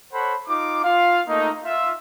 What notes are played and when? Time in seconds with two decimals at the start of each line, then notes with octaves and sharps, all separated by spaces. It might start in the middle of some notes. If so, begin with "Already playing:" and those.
0.13 A4 C5 C#5 F#5 B5
0.48 D#4 F4 D6
0.84 F4 F5
1.28 A3 A#3 D#4
1.65 F4 E5